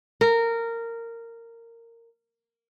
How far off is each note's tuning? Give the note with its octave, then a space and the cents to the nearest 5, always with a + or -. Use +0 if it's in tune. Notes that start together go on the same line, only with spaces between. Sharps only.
A#4 -15